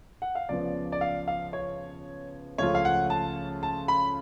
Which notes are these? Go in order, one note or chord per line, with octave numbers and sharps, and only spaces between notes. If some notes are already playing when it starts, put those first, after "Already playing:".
F#5
F5
C#2 C#3 F3 B3 D5
D5
F5
F5
C#5
C#2 C#3 F3 A3 F4 C#5
F5
F#5
A5
A5
B5